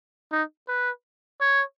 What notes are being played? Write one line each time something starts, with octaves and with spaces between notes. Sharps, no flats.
D#4
B4
C#5